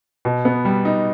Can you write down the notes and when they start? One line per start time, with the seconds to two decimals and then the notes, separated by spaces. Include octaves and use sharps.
0.25 B2
0.45 B3
0.65 G3
0.85 D#4